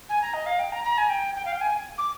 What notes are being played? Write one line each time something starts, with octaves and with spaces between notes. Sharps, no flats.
G#5
A#5
D#5
F5
G5
A#5
A#5
G#5
G5
G5
F5
G5
G#5
D6